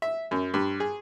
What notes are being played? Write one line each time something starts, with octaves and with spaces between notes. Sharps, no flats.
E5
F#2
G2
G#4